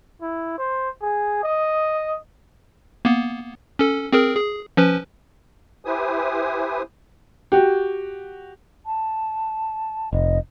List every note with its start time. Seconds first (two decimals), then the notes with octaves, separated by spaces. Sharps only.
0.21 E4
0.58 C5
1.02 G#4
1.44 D#5
3.05 A#3 B3
3.79 C#4 A4
4.12 C4 G#4 A#4
4.35 G#4
4.77 F3 C#4 B4
5.85 E4 G4 B4 C5 G#5 D#6
7.52 F#4 G4
8.86 A5
10.13 F1 D#5